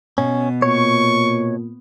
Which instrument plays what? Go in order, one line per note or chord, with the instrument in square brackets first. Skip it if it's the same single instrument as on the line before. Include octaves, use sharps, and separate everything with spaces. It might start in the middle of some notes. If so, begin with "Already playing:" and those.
[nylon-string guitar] B2 [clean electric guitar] C#4
[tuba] A#2 [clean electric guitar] C#5 [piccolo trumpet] C#6